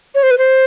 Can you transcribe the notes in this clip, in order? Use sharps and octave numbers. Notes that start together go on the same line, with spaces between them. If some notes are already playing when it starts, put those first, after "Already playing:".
C#5
C5
B4
C5